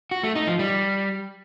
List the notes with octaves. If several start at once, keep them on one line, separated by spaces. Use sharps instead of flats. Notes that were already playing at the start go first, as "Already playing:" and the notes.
F#4
A3
D#4
F3
G3